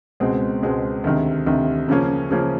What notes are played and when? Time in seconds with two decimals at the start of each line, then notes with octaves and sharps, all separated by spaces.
0.20 C#2 B2 G#3 C4
0.62 C#2 B2 G#3 C4
1.04 D2 C3 D#3
1.46 D2 C3 D#3
1.89 C#3 F3 A#3 C#4
2.30 C#3 F3 A#3 C#4